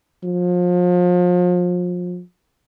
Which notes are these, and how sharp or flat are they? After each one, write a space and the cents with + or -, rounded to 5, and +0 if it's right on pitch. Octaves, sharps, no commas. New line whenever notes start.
F3 +35